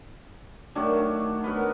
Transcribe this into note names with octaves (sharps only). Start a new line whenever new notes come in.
D#3 F#3 A3 D4
F#3 B3 A#4 B4